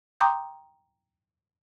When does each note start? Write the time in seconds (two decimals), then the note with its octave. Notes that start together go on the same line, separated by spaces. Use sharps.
0.20 G5 A#5 C6 D6 D#6 G6